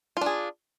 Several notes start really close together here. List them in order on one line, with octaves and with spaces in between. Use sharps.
F4 D4 G#4